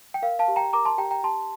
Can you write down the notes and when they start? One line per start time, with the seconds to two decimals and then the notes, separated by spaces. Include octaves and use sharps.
0.14 G5
0.22 A#4 F5
0.39 F5 A5
0.48 G4
0.56 G5 A#5
0.73 A#4 A#5 D6
0.85 A5 C6
0.98 G4 G5 A#5
1.11 G5 A#5
1.23 G4 A5 C6